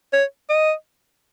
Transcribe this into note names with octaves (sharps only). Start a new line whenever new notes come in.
C#5
D#5